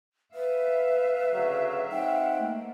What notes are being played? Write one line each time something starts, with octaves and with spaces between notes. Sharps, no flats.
B4 E5 F5
D2 C#3 F#3
C4 D#4 F#5 G5
A3 A#3